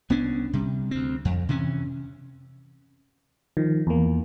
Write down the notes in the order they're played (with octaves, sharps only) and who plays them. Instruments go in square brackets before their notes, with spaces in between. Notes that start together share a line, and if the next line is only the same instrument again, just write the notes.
[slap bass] C2 B3 C#4 D4
C3 G3
D2 C4
F2
C3 E3 C#4
[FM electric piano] D#3 F3
E2 A#3